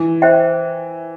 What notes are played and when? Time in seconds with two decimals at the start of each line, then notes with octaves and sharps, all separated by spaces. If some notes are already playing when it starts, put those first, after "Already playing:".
Already playing: E3
0.22 C5 E5 G5